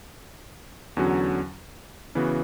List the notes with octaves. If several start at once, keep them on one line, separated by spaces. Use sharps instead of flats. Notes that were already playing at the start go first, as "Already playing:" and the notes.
E2 D3 F#3 C#4 F#4
C#3 E3 B3 F#4